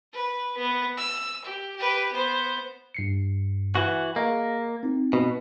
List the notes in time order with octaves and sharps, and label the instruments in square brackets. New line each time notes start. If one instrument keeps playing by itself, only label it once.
[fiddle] B4
B3
E6
G4
G4 B4
B3 C5
[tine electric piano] G2 C7 C#7
[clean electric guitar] E3 F#4
[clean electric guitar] A#3 [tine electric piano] G#4 D#5
[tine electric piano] C4 D#4
[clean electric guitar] B2